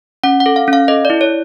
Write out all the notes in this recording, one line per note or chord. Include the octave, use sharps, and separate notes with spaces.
C#4 F#5
F#5
A4
F5
C#4
F5
A4 D#5
D5
E4
C#5